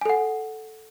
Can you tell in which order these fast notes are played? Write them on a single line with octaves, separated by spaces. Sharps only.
G#5 A4 F#5